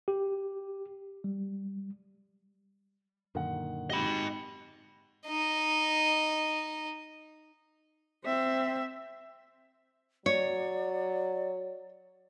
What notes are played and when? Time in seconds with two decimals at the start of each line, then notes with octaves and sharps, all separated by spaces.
0.08 G4
1.24 G3
3.35 F#2 A#2 D3 D#3 F#5
3.90 G#2 G4 D#5 B5
5.27 D#4 D#5
8.24 C4 E5
10.26 F#3 C#5 D5